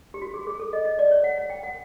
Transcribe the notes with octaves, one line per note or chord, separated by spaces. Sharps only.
G4
F#4
G#4
G#4
A4
D#5
D#5
D5
C#5
F#5
F#5
G5
F#5